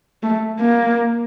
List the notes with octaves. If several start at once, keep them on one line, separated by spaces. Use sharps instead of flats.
A3
A#3